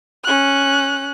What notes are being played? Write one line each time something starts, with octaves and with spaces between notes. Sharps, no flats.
C#4 F#6